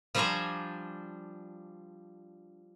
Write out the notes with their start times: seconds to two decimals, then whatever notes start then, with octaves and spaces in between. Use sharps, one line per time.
0.15 F3 G3 D4 C5 G#5 A#5